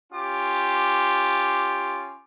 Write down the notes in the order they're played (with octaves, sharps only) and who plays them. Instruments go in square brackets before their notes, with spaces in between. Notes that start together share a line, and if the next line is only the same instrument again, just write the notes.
[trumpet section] C#4 F4 G4 D6